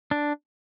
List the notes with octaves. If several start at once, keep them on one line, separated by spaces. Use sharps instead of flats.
D4